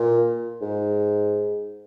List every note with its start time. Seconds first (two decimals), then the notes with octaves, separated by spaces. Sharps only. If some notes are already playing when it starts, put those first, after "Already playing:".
Already playing: A#2
0.62 G#2